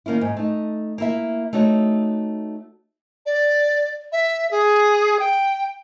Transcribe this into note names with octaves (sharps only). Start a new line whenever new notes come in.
D#3 A#3 C#4 E4
G#2
A3 D#4
A#3 E4 E5
A3 D#4 F#4 C#5
D5
E5
G#4
G5